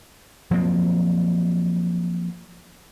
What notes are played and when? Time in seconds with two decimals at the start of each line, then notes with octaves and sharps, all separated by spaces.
0.51 F3 F#3 A#3 C4